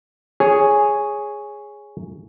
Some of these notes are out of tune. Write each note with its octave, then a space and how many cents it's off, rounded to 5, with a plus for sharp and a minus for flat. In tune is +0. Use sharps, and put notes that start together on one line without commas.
G#4 +0 C#5 +0